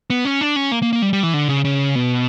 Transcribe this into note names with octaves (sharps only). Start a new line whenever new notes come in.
B3
C#4
D4
C#4
A#3
A#3
A#3
G3
G3
E3
D3
C#3
C#3
B2